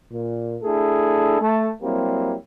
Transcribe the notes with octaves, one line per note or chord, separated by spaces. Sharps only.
A#2
A3 D4 E4 G#4 A4
A3 A5
F#3 G3 A#3 C4 E4 G4